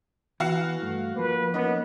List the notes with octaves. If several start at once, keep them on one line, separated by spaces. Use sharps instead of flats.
E3 B3 F#4 F5 F#5
G2 A3
F3 A#3 B4
A#3 B3 C#4 D#4